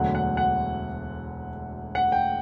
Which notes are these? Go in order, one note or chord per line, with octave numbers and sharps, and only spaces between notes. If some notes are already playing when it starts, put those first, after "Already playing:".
Already playing: E1 D2 D3 F#3 F#5
F#5
F#5
F#5
G5